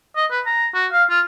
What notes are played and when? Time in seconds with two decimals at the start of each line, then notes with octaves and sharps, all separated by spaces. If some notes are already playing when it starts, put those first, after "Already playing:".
0.16 D#5
0.31 B4
0.46 A#5
0.74 F#4
0.92 F5
1.10 F4